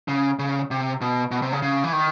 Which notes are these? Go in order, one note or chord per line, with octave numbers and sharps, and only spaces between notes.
C#3
C#3
C3
B2
B2
C3
C#3
C#3
E3
D#3